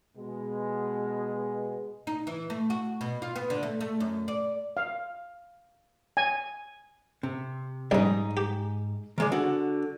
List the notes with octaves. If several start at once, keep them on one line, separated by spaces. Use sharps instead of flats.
B2 G#3
D#4
E3
A3
F#4
B2
F4
B3
D3
A3
A3
F#2
D5
F5
G#5
C3
A#1 G#2 G3 C#4 D#4
G4
D#3 G#3 D5
D3 F#4